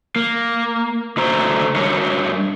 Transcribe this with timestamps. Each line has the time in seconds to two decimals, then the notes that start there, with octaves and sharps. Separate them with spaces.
0.16 A#3
1.17 D3 A3 F#4 C5 A#5
1.76 G3 D4 F#4 A#4 C#5